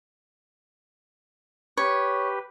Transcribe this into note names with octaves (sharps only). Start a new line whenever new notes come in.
G4 B4 C#5